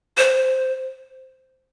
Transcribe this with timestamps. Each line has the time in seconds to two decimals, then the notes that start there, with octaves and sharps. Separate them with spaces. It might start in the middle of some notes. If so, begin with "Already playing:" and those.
0.17 C5